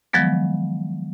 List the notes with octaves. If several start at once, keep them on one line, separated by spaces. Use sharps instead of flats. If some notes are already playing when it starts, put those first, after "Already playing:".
D#3 F3 F#3 G#3 B3